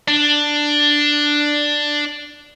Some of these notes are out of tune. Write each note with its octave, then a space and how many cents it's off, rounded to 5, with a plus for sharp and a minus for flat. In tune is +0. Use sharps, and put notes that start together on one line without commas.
D4 +5